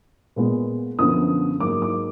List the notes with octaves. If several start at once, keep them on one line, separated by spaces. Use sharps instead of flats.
A#2 G#3 B3
F#2 D3 F3 B3 D#6
G#2 F#3 A#3 D6
D6